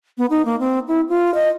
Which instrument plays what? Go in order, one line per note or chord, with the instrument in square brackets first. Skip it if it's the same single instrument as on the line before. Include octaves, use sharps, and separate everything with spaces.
[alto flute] B3
D#4
A#3
C4
E4
F4
D#5